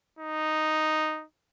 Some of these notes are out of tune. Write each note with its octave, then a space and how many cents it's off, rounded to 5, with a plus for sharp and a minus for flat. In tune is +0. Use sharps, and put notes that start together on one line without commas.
D#4 -5